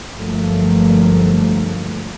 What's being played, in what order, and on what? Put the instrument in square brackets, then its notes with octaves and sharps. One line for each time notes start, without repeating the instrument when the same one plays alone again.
[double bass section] G1 G2 F3 F#3 A3 A#3